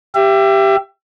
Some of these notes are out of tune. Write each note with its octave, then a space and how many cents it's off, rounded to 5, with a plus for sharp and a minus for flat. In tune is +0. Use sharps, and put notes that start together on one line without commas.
G4 +0 E5 +30